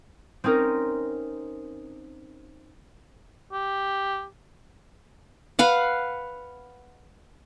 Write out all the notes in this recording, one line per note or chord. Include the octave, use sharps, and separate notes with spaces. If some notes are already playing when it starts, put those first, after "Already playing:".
C4 C#4 D#4 A#4
G4
B4 F5 F#5